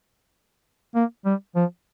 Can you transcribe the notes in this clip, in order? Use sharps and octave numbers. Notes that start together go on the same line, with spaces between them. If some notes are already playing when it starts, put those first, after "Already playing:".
A#3
G3
F3